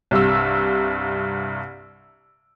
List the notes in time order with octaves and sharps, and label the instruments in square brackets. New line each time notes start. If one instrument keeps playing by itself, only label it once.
[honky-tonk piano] C2 G2 E6